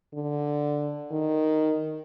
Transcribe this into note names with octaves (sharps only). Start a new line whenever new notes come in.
D3
D#3